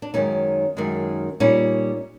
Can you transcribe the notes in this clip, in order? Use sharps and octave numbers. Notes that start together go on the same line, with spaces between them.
D4
F#2 D#3 G#3 C#4 D#4
F#2 D#3 G#3
A#2 G3 A#3 C#4 D#4